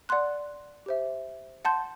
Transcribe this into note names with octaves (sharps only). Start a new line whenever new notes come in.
D5 F#5 C6 F#6
G4 C5 E5
F#5 A5 C6 G6